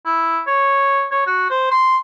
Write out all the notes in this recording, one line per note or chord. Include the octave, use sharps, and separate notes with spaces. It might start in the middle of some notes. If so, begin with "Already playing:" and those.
E4
C#5
C#5
F#4
C5
C6